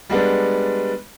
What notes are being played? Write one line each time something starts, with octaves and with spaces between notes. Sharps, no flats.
G3 G#3 B3 D4